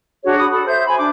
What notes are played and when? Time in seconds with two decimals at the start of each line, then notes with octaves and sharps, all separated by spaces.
0.24 D4 F#4 G#4 C#5
0.38 B5 D#6
0.51 A4 B5
0.67 C5 E5 G6
0.87 G#5 B5
0.98 D4 D6